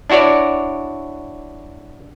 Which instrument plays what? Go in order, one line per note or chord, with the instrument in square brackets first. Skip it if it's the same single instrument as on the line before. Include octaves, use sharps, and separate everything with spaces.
[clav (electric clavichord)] D4 E4 F#4 C#5 D5